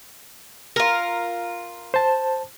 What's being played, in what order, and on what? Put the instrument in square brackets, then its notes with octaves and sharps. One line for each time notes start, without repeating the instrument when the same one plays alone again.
[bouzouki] F4 A#4
[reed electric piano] C5 A5